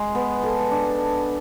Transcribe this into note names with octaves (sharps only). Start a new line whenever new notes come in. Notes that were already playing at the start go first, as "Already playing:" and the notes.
Already playing: G#3
B3
A4
D4